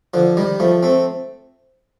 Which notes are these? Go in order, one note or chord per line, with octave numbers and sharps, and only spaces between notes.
D3 F3
D#3 G3
F3 A3
A3 C4